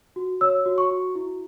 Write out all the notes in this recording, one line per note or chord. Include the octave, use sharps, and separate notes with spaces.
F#4
C#5 E6
F#4
C#6
F#4
E4